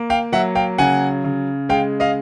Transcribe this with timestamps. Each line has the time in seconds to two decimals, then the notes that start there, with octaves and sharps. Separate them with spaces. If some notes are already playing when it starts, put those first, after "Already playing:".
Already playing: A#3
0.10 F5 G5
0.32 F#3 E5 F#5
0.55 F5 G5
0.78 C#3 F#5 G#5
1.24 C#3
1.69 G#3 F5 G5
2.00 D#5 F5